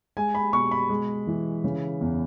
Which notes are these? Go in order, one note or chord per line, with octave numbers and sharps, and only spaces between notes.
G#3 G#5
B5
B2 C#6
B5
G#3
E3
C#3
E2